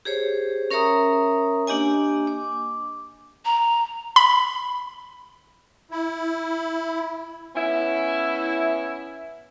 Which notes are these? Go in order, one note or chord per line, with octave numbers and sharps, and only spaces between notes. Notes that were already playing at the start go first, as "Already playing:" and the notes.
G4 G#4 C5 C#5
C#4 A#4 C#5 E5 A#5 D#6
A#3 D4 G4 D#5 G#5
D6
A#5
B5
E4
B3 C#4 E4